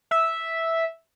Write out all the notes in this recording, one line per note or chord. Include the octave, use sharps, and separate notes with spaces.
E5